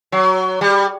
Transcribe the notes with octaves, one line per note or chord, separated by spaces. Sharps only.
F#3
G3